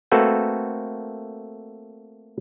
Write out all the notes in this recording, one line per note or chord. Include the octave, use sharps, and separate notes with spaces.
A3 A#3 C4 F#4 A4 B4